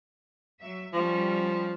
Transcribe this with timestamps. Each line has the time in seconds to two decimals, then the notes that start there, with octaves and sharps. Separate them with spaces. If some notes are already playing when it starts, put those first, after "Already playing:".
0.59 F#3 E5
0.93 F3 G3 C#4